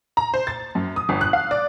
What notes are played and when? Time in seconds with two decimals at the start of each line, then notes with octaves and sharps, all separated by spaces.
0.17 A#5
0.34 C5
0.47 A6
0.75 F#2
0.96 D#6
1.09 G1
1.21 F#6
1.33 F5
1.51 D5